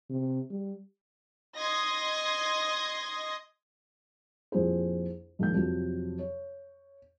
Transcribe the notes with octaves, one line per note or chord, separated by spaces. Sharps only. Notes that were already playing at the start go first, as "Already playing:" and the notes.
C3
G3
D#5 C6 D#6 G#6 A#6
A#1 F2 E4 G4 G#4 C5
A#1 D#2 G#2 G#3 G6
F2 C3 F#3
C#5